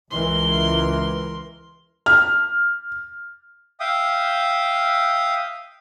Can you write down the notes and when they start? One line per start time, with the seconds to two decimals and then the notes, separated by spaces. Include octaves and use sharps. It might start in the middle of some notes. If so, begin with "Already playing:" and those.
0.11 C#2 E3 A#4 C6
2.06 F6
3.80 E5 F5 G5 D#6